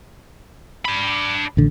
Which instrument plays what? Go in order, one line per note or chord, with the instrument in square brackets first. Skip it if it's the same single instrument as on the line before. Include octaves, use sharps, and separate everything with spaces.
[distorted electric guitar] D4 B5
[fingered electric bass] A1 D3